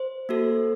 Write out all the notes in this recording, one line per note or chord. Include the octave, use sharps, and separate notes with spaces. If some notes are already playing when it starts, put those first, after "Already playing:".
Already playing: C5
A#3 F#4 A4